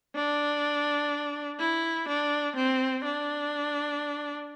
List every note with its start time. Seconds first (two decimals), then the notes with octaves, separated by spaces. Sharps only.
0.15 D4
1.60 E4
2.08 D4
2.56 C4
3.04 D4